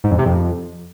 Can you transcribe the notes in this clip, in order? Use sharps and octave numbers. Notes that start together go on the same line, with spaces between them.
G#2
F2
C3
F2